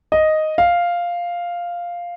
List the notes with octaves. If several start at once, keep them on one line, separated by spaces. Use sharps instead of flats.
D#5
F5